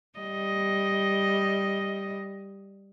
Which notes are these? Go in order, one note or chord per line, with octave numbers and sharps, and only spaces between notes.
G3 D#5